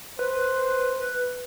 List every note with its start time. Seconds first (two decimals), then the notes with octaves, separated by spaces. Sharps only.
0.19 B4 C5